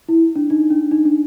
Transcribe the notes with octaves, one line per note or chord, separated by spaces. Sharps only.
E4
D4
D#4
D4
D#4
D4